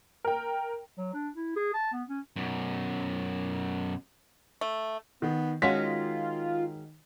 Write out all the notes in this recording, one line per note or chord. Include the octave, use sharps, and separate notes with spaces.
A#4 G5
F#3
D4
E4
G#4
A5
B3
C#4
F#2 B2
A3
D#3 B3
D#3 G#3 C#4 F4 F#4 B6